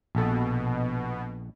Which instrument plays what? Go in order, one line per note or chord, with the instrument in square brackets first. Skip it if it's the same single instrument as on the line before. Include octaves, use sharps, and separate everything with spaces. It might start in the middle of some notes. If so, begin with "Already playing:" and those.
[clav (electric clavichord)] A#1 A4 [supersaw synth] B2